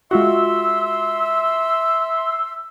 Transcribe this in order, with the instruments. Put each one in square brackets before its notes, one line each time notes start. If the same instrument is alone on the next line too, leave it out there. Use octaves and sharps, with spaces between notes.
[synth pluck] G#3 F4 F#4 [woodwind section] E5 C6 E6